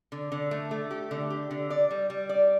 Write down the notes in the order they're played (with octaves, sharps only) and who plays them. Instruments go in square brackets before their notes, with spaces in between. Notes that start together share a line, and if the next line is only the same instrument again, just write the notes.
[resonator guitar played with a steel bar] D3
D3
A3
A3
G4
D3
G4
D3
D5
G3
G3
D5